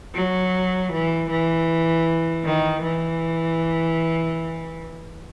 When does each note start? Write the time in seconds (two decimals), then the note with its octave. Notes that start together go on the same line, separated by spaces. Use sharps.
0.15 F#3
0.92 E3
1.30 E3
2.45 D#3
2.82 E3